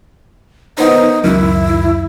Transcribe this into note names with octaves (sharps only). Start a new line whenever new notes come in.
D#3 B3 D#4 C5
C#2 F#2 D#3 E4